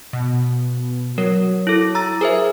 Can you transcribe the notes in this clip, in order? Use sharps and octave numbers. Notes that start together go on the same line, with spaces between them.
B2
F#3 A#4
E4 A4
A#5 E6 A6
G#4 A#4 C5 E5